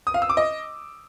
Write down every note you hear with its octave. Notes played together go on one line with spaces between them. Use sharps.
D#6
F5
E6
D6
D#5